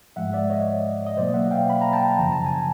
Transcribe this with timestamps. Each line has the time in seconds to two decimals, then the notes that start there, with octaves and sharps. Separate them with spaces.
0.16 G#2 F3 G#3 E5 F#5
0.33 D5 E5
0.50 C#5 D#5
1.07 D#5
1.17 B2 F#3 A#3 C5 D5
1.34 E5 F#5
1.51 F5 G5
1.70 B5
1.81 A#5
1.93 G5 A5
2.18 F#2 C#3 F3 A#5
2.32 A5
2.46 G#5